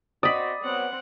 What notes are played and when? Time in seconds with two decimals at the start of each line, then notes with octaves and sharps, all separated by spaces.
0.23 C4 F#4 D5 D#5 B5 D#6
0.62 F#3 B3 C4 F#5